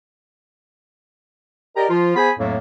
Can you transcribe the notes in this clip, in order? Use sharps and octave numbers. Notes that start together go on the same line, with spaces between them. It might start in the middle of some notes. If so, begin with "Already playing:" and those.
G4 A#4 D5 D#5 A#5
F3 F4
B3 G#4 C5 G#5 B5
F2 A2 F#3 A3 A#3